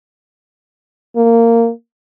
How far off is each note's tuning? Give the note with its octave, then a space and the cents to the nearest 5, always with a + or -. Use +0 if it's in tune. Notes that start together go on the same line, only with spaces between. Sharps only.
A#3 -15